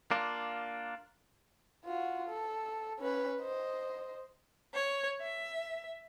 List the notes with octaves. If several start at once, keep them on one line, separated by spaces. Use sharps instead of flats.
A#3 D4 F4
F4 F#4
A4
C#4 B4
C5 D#5
C#5
E5